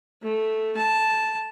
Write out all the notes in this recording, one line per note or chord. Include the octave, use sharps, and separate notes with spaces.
A3
A5